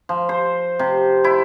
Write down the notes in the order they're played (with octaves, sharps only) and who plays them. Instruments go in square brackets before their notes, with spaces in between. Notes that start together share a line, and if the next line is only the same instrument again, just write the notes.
[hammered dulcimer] F3
C5
C3
E4